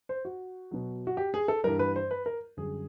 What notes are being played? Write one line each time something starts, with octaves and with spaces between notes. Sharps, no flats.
C5
F#4
B2 F#3
F#4
G4
G#4
A4
G2 E3 G3 A#4
B4
C5
B4
A#4
F#2 D3 G3 G#4